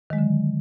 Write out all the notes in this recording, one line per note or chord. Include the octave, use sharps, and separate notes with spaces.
D3 D#3 F#3 G#3